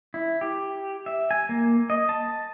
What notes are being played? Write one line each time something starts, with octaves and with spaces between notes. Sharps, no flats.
E4
G4
E5
G#5
A#3
D#5
A5